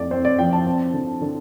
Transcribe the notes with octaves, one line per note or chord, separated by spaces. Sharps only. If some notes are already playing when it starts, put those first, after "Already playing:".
Already playing: F2 A3 D5
C4 C5
D5
F3 G5
A5
C4
D3
D3